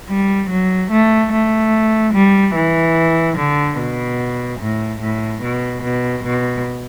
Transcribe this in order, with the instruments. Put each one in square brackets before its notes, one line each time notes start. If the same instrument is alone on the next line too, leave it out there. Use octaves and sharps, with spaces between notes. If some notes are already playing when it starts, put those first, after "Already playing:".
[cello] G3
F#3
A3
A3
G3
E3
D3
B2
A2
A2
B2
B2
B2